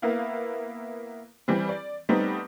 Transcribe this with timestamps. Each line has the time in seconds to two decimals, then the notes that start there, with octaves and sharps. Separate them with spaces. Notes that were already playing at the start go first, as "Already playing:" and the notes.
0.02 A#3 B3 E4 F5
1.48 E3 G3 C4
1.69 D5
2.09 G3 A3 B3 C4 D#4